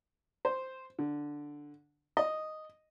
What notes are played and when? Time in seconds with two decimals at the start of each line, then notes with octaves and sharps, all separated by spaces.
0.45 C5
0.99 D3
2.17 D#5